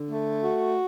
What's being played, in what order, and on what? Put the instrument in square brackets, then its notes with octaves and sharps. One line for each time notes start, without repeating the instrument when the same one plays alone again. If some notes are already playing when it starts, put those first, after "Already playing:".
Already playing: [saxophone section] D3
A3
F#4